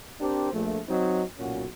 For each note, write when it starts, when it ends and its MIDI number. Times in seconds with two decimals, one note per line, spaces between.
0.20 0.51 60
0.20 0.51 62
0.20 0.51 67
0.20 0.51 70
0.20 0.51 72
0.53 0.80 34
0.53 0.80 57
0.89 1.23 54
0.89 1.23 60
0.89 1.23 63
1.38 1.65 35
1.38 1.65 46
1.38 1.65 61
1.38 1.65 66